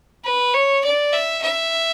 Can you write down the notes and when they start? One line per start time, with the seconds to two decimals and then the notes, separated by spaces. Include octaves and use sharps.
0.24 B4
0.53 C#5
0.84 D5
1.13 E5
1.43 E5